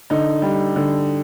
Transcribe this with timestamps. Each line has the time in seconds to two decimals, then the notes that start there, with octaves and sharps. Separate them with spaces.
0.10 D3 D#4
0.42 G3
0.76 D3